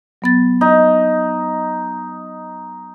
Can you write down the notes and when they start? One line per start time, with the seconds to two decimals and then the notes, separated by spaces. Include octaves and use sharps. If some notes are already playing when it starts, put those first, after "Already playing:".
0.22 F#3 B3 A6
0.61 D#4